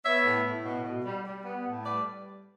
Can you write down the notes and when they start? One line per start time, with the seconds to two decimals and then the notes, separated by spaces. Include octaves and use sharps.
0.05 B3 C#5 E5
0.25 A2
0.45 A2
0.65 B2
0.85 B2
1.05 G3
1.25 G3
1.45 B3
1.65 A2
1.85 G3 B4 D5